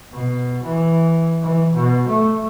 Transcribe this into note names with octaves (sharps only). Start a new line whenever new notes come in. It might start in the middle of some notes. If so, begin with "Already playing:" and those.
B2
E3
E3
B2
A3